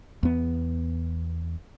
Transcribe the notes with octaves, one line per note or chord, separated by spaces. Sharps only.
E2 B3